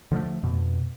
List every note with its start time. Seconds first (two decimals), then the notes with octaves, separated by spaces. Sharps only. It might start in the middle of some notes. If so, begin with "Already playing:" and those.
0.12 D3 F3 G#3 A3
0.43 F2 B2